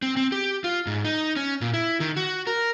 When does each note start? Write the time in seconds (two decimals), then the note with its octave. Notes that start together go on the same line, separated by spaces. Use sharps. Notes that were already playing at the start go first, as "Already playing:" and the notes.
0.02 C4
0.17 C4
0.32 G4
0.64 F4
0.87 G#2
1.05 D#4
1.36 C#4
1.61 A#2
1.74 E4
2.00 D#3
2.16 F#4
2.47 A#4